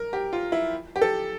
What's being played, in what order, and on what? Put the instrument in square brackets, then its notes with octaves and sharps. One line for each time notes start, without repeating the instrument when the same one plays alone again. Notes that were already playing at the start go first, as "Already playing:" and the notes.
Already playing: [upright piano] A#4
G4
F4
E4
G4
A4